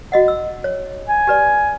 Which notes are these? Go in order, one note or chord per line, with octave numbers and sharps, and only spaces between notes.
F#4 D#5 F#5
E6
C#5
G#5
G4 B4 D5